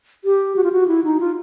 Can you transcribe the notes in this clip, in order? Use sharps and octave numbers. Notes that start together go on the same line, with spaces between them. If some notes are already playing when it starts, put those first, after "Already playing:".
G4
F#4
F4
F#4
E4
D#4
F4